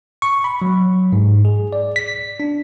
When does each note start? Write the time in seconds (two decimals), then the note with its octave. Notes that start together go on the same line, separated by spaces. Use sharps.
0.22 C#6
0.44 B5
0.62 F#3
1.12 G#2
1.45 G#4
1.73 D5
1.96 B6
2.40 D4